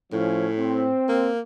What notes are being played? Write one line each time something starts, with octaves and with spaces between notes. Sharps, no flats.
A2 F3 C#4
C4
A#3